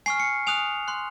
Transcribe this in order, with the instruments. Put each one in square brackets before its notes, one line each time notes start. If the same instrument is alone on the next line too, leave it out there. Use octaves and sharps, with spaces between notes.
[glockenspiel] G#5 C#6 F6 C7
C#7
G#5 D#6 F#6 F7
C6 F#6